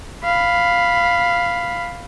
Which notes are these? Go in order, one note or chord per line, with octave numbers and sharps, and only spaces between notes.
F5 B5